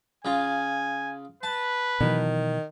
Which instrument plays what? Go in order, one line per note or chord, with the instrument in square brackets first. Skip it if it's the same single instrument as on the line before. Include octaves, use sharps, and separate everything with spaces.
[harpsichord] C#3 F4 [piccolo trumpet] G#5
[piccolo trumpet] B4 [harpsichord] A5
[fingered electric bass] B2 E3 F#3 [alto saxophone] D#3